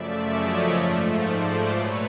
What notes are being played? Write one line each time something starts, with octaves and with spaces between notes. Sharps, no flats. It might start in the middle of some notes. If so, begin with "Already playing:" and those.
Already playing: F#2 C#3 F3 A3 D5 E5
C#5 D#5
G#2 F3 A3
C5 D5
A#2 F#3 A3 B4 C#5